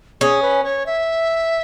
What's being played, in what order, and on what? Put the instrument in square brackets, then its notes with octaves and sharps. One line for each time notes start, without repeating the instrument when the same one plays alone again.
[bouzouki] C#4 [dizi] G#4
[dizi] B4
C#5
E5